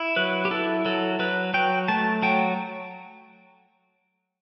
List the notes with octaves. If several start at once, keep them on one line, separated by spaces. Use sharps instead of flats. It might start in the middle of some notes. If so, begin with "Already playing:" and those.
Already playing: E4
F#3 B4
G4
E4 A4
F#3 A4
F#3 B4
F#3 G5
A3 A5
F#3 G5